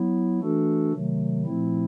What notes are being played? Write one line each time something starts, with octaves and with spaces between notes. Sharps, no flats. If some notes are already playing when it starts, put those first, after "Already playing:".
Already playing: F#3 B3 E4
E3 A3 D4 F#4 A4
C3 D#3 F#3 A3
A#2 F3 A3 C4 E4